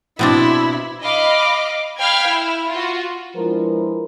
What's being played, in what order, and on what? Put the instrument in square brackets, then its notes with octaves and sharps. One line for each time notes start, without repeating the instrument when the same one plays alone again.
[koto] B2 C4 D4 [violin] E4
[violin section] D#5 F5 B5 D6
F5 G5 B5 F6 G#6
E4
F4 F#4
[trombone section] F3 G#3 D4 E4 A#4 B4